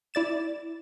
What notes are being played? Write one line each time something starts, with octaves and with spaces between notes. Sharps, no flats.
E4 D5 A6 E7